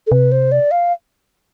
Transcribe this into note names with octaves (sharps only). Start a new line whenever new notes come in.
A4
C3 B4
C5
D5
F5